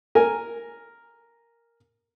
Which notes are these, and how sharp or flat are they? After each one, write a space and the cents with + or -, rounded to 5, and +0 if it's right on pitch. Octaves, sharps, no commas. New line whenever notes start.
A#4 +0 G#5 -5